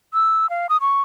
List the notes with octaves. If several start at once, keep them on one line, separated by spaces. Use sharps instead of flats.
E6
F5
D#6
C#6